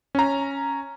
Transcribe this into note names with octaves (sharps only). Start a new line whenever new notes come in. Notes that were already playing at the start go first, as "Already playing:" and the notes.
C#4 A#5